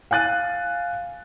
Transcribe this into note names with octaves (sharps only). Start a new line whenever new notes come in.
F5 G#5 F#6 A6 D#7